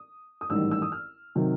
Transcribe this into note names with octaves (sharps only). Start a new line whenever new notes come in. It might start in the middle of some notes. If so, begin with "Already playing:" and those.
Already playing: D#6
D#6
A1 G#2 D#3 G3 E6
E6
D#6
F6
C3 D#3 F#3